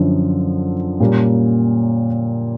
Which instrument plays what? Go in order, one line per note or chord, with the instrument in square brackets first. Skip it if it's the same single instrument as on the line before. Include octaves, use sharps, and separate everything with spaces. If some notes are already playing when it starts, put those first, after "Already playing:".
Already playing: [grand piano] F#2 D3 F3
A#2 G3 A#3 C#4